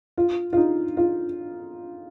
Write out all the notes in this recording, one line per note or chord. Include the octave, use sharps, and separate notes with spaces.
F4
F4
D#4
F4